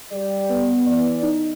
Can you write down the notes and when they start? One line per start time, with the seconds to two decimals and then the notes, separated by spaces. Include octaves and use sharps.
0.12 G3 G4 D5
0.49 B3
0.87 E3 D5
1.22 D#4